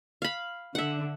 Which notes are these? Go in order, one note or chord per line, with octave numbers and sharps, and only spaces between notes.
F5 B5
D3 E5 F#5